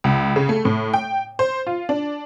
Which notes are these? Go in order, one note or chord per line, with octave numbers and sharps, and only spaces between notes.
C#2
C#3
A3
A2
G5
C5
F4
D4